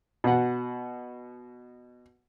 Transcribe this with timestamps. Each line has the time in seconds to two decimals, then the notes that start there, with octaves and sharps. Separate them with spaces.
0.24 B2 F#5